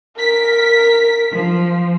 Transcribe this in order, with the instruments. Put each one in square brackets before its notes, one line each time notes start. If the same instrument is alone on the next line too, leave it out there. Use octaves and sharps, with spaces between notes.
[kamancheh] A#4 [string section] B6
[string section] F3